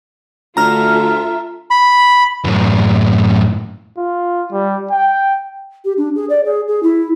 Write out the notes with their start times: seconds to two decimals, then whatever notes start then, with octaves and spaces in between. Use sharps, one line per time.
0.57 D2 F4 A4 E5 A#5 F6
1.71 B5
2.45 F#2 A2
3.97 F4
4.52 G3
4.91 G5
5.85 G4
5.97 D4
6.15 G#4
6.29 D5
6.45 G#4
6.68 G#4
6.83 E4